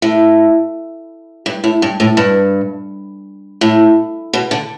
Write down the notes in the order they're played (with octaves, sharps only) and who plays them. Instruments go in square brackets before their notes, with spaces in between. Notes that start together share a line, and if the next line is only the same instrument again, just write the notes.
[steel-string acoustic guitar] A2
G2
A2
G2
A2
G2
A2
B2
D3